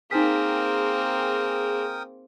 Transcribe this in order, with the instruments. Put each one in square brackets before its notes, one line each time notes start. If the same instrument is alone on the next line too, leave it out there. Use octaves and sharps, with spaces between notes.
[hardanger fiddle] A#3 C4 [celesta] D#4 B6 [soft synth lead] G#4 [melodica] A#4 G5 D#6